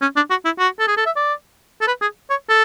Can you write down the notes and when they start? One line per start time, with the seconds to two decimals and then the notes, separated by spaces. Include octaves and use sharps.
0.01 C#4
0.16 D4
0.30 F#4
0.45 E4
0.59 F#4
0.79 A4
0.87 G#4
0.97 A4
1.06 E5
1.16 D5
1.81 A4
1.87 B4
2.01 G#4
2.30 C#5
2.49 A4